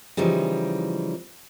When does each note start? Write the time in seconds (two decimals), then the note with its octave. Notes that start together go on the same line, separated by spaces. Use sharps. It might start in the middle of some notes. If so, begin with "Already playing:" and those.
0.17 C#3 E3 F3 G3 D#4